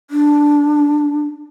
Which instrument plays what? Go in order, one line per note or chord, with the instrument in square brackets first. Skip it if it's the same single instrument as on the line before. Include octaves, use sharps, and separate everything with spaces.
[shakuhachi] D4